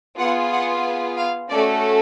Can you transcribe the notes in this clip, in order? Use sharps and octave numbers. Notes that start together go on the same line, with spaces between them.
B3 F4 G#4 F#5
F#5
F5
A3 C#4 F#4 A4 D5